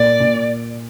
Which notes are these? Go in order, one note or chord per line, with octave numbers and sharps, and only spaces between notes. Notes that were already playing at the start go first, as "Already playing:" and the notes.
Already playing: A#2 D5
A#2